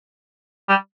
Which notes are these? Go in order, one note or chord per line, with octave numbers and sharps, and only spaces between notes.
G3